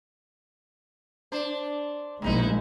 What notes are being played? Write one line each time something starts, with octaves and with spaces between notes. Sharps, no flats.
D4 C5
A#1 B2 G#3 D#4 E4